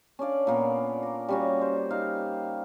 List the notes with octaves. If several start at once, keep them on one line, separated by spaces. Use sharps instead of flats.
C#4 D4 D5 F5
A#2 A#3 B3
A#4
G3 C#4 F#4
C5
D#4 F5